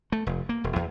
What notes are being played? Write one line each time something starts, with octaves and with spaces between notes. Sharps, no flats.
A3
F1
A#3
E1
E2